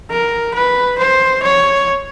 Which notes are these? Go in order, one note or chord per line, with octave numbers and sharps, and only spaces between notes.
A#4
B4
C5
C#5